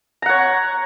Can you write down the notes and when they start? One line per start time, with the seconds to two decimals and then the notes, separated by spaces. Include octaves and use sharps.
0.22 A#5
0.26 F#5
0.29 C#5